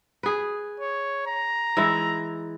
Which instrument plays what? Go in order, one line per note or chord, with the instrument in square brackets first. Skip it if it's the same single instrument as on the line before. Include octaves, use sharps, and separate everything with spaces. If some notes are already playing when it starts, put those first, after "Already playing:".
[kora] G#4 B4
[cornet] C#5
A#5
[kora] E3 G#3 E4